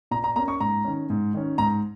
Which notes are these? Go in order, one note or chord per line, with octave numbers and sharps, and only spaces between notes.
A#2 A#5
A#5
A#3 C#4 A#5
C#6
G#2 A#5
D#3 C#4
G#2
D#3 C#4
G#2 A#5